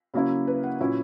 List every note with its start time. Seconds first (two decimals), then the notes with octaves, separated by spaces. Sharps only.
0.14 C#3 F#3 A#3 C#4 E4
0.47 B4
0.64 F#5
0.80 A#2 F#3 C#4 E4